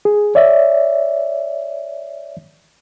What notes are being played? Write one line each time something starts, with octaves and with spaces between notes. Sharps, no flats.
G#4
C#5 D5 E5